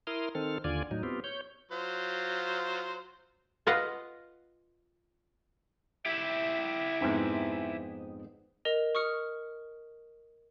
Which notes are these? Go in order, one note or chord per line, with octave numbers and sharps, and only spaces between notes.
E4 A#4 C6 D#6 F6
D#3 C4 A4 F6
D#2 D3 F4 D5 G#5
A2 F#3 D#4
B3 C4 F4 G4
C#5 G6
F#3 F4 C5
F4 B4 D#5 F5 F#5
E4 G4 E5
F2 G#2 B3 C4 D#4
A#4 D#5 F7
C#6 D#6 F6 C#7